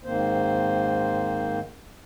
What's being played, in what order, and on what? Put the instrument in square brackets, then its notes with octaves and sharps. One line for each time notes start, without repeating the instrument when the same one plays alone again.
[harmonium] G#2 D#3 A#3 C4 C5